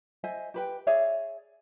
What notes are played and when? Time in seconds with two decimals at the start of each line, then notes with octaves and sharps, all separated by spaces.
0.24 C5 D#5 E5 G#5
0.54 G4 B4 G5
0.87 G#4 C#5 D5 E5